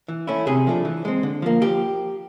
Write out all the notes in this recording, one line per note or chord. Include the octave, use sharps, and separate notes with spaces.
E3
A3 C#4 E4
C3 G#4
F3 A3 D4
E3
G#3 C4
D3
F3 A#3
F3 G4